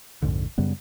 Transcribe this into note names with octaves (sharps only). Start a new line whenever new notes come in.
A#1 F2 G#2 D3
F#2 C#3 G3 B3